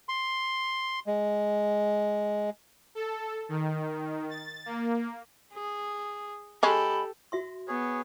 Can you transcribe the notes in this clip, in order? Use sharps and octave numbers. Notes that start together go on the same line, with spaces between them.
C6
G#3
A4
D#3
A6
A#3
G#4
G#3 C#4 G4 A4 B5
F#4 E5 C6
B3 G#4 C#5